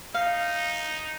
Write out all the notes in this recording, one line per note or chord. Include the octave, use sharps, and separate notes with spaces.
D#4 F5